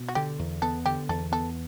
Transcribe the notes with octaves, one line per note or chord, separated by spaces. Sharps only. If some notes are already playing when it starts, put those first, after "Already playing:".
Already playing: B2
F#4
D3 G4
E2
B3 A4
D3 G4
E2 A4
B3 A4